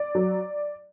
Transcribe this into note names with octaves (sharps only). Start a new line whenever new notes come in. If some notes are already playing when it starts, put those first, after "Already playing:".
Already playing: D5
F#3